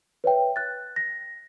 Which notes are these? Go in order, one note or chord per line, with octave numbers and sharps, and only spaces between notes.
B4 C#5 E5 G5
F#6 A6
A#6